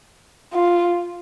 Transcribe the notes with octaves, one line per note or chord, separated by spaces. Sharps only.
F4